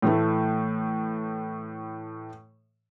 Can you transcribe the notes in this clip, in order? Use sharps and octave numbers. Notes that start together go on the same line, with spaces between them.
A2 E3 A3